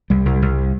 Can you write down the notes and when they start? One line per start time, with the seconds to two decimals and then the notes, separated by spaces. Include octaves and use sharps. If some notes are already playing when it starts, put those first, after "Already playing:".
0.10 C2 G3
0.26 C2
0.42 C2